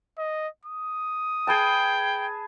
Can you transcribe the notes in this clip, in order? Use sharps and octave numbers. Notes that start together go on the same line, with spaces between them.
D#5
D#6
G#4 B4 G5 A5